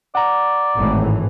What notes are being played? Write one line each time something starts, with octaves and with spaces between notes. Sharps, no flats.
D5 F#5 A#5
G#1 A2 E3